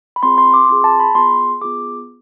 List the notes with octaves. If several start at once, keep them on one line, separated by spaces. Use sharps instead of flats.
B5
C4 F4 G#4 C6
C6
D6
C4 F4 G#4 C6
A5
B5
B3 F4 G#4 C6
B3 F4 G#4 D6